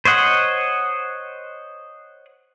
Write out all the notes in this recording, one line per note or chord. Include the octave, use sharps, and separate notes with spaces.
C5 C#5 D#5 F#5